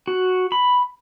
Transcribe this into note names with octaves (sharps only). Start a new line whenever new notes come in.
F#4
B5